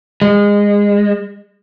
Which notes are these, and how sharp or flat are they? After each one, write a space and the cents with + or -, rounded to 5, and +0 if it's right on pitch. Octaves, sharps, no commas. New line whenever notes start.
G#3 -25